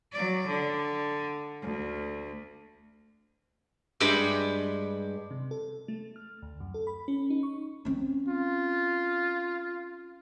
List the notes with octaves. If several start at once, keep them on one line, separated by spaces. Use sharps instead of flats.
F#3 D5
D3
D2
G2 G3 G#3 G5 B5
C3
A4
A3
F6
D2
F#2
A4
B5
C#4
D#4
C#6
C4 C#4
F4